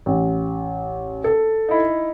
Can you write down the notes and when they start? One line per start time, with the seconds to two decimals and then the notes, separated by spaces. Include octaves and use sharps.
0.06 A1
1.24 A4
1.69 D#4 E4